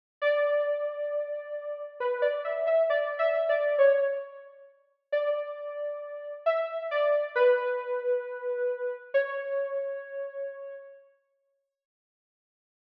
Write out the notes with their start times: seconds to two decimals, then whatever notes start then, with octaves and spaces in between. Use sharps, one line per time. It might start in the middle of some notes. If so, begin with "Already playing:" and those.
0.22 D5
2.00 B4
2.22 D5
2.44 E5
2.67 E5
2.90 D5
3.19 E5
3.49 D5
3.78 C#5
5.12 D5
6.46 E5
6.91 D5
7.36 B4
9.14 C#5